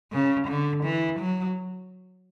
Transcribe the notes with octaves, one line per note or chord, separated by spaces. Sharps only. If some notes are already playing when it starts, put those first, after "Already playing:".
C#3
D3
E3
F#3